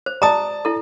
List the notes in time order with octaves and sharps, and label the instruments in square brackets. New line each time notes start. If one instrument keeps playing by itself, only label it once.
[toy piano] C5
[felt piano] D5 A5 [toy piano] A#5 D#6
[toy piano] E4 A4